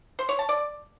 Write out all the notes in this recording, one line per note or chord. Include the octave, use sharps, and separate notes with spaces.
C5
C#5
A5
D5